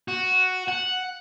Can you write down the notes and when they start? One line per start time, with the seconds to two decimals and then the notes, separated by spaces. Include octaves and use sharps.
0.08 F#4
0.68 F#5